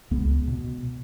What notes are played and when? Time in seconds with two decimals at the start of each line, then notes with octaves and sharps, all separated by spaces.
0.11 C#2 B3
0.48 B2